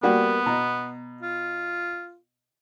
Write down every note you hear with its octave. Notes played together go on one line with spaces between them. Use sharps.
G3 A#3 B3 F#4
B2 A#5
F4